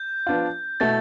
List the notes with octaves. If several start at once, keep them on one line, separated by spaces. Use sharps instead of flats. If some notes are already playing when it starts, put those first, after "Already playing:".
Already playing: G6
F3 B3 D4 F4
B2 A3 E4 A6